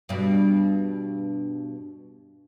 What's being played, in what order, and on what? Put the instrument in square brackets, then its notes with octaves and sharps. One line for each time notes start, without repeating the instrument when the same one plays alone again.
[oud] G2 B2